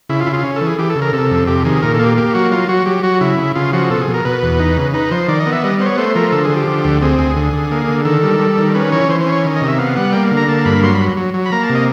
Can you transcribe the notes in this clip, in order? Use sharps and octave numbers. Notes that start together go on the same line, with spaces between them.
C#3 E4
F4
C#3 E4
F4
C#4
A4
E3
G#4
E3 G4
A4
C#3
A#4
C3 A4
F2
C3 G4
D#3 G#4
A#2 A#4
A4
A#3
G4
A#3 G4
F#3 F#4
F#3 F4
F#3 F#4
F#3 G4
F#3 F#4
C#3 E4
C#3
C#3 F4
F3 F#4
B2 A4
G#4
B2
A#4
B2 B4
E2
D#4
C#3
D#4 B4
F3 C5
D#3 D5
D#5
B3
E5
G3 D#5
B3 C5
C#5
A3 C5
F3 A#4
D3 A4
G#4
F3
G4
D3
D2
C4 G#4
D2 G#4
D3
D3
A#3
D3
D#3 A4
G3
G3
D#3
C#4 B4
E3 C#5
E3 C5
C5
C#4
C#5
D#3
D#5
C3
E5
B3 F5
G3 F#5
A#3 G5
D3
A#5
A#3 A5
G2 B5
F#3 C6
B5
F#3
F#3
F#3
B5
A#3 A#5
A5
C3
D#5